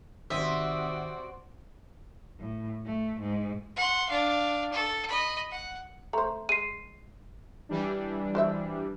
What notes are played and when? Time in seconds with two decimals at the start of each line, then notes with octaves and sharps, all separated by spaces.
0.30 G#1 C3 D#3 C4 F#4 D5 E5 D#6
2.40 A2
2.85 A3
3.20 G#2
3.77 F#5 C6
4.09 D4 F5
4.73 A4
5.09 D#5 B5
5.51 F#5
6.13 A3 C5 A#5
6.49 G#3 C7 D#7
7.69 E3 G3 D4
8.35 F#4 C5 E5